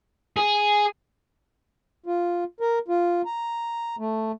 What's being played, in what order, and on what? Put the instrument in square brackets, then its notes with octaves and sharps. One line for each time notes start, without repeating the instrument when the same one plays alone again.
[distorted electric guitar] G#4
[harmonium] F4
A#4
F4
A#5
A3